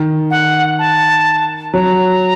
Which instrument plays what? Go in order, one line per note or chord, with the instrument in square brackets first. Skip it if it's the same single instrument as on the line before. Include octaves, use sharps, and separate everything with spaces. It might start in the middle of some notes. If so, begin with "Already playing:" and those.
Already playing: [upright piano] D#3
[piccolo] F#5
A5
[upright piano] F#3 [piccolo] A#5